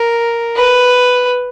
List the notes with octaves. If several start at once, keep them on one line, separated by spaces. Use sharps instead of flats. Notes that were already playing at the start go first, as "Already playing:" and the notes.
Already playing: A#4
B4